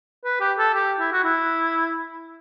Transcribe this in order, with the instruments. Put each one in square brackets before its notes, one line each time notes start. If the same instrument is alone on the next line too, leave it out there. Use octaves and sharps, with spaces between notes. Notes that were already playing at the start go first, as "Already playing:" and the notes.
[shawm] B4
G4
A4
G4
E4
F#4
E4